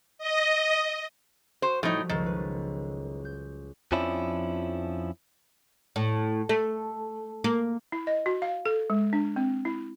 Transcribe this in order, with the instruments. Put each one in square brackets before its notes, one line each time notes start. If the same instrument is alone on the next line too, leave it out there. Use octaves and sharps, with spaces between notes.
[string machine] D#5
[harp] F#4 [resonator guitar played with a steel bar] C5
[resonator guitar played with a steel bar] A2 D#4 [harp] F3 G3
[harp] F#1 C#2 A4 [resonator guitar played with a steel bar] D#3
[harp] B4
G6
[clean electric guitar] F2 F3 C#4 D4 E4
[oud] A2
A3
A#3
[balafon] E4
D#5
F#4
F5
A4
G#3
D4
C4
E4